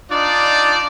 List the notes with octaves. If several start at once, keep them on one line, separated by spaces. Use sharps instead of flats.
D4 D#4 F4 D5